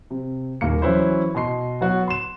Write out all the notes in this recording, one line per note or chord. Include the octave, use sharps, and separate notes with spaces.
C3
D#1 D#2 A#3 C#7
E3 F#3 C#4 E4 B4 C5
B2 D#5 C6 C7
F#3 B3 F#4
C6 E7